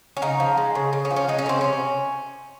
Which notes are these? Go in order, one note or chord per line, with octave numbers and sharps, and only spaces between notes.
C#4
C#3 D#4
F3
G#3
C#3
C#3
C#4
F3
C#4
G#3 D#4
C#4
C#3 C4
C3 C#4